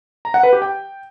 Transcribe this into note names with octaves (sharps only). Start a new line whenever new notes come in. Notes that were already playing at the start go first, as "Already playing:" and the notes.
A#5
F#5
B4
G4
G5